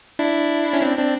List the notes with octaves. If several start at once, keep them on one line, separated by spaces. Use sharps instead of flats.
D4 E4
C#4
C4 D4
C4 D4